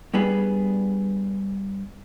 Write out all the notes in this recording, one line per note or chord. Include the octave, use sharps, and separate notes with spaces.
G2 G3 B3 G#4